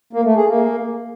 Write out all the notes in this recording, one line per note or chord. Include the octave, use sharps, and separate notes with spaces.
A#3
A3
G#4
A#3